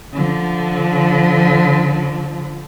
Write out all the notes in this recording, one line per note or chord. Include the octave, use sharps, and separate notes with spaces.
D3 F3